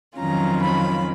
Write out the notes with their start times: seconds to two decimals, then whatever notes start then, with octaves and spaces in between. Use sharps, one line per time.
0.18 F2 D#3 F#3 C#4 F4 A#5
0.61 B5